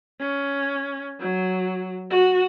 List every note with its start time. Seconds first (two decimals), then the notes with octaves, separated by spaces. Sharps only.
0.20 C#4
1.20 F#3
2.10 F#4